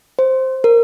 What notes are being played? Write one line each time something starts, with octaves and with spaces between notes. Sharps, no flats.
C5
A#4